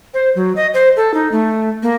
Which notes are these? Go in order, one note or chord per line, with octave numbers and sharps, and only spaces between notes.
C5
F#3
D#5
C5
A4
D#4
A3
A#3